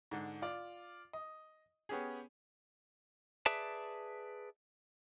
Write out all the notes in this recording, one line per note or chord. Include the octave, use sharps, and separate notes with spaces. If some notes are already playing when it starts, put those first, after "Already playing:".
G#2 D3
F4 D5
D#5
B3 C#4 G4 G#4
G#4 B4 D5 E5 A5